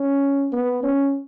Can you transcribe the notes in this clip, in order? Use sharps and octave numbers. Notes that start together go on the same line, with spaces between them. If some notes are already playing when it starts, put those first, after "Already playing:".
Already playing: C#4
B3
C#4